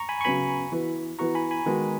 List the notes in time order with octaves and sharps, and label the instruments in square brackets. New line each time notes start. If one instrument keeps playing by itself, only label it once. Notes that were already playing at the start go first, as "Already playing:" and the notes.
Already playing: [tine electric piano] A#5 C#6
G#5 B5
C#6
[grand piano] C#3 F#3 B3 [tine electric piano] G#5 B5
[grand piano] E3 B3 F#4
[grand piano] E3 B3 F#4 [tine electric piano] A#5 C#6
[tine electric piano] G#5 B5
G#5 B5
[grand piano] D#3 G#3 B3 F#4